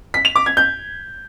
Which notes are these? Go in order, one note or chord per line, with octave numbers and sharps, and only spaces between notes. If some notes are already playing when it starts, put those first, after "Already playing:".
B6
F7
D6
G#6
G6